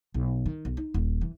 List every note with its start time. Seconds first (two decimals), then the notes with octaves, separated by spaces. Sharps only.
0.14 B1
0.46 D#3
0.65 B1
0.77 D#4
0.94 D#1
1.21 E3